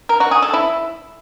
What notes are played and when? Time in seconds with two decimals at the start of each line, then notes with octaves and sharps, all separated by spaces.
0.09 A#4
0.20 F#4
0.31 G#4
0.42 A4
0.53 E4